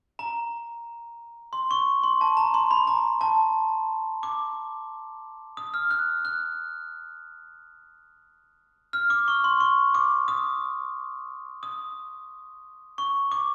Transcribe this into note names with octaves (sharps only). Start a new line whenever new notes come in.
A#5
C6
C#6
C6
A5
A#5
C6
B5
A#5
A5
D6
D#6
F6
F#6
F#6
F6
D6
C#6
C6
C#6
D6
D#6
D#6
C#6
D6